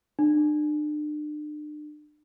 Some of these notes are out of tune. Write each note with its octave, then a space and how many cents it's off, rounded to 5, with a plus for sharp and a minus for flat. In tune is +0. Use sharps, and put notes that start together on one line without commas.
D4 +40